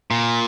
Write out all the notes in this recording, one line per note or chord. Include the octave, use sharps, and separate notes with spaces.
A#2